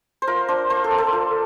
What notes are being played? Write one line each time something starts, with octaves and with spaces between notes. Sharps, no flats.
C5
F4 A#4
D4 C5
A#3 C5
A4
A#3
A4
F4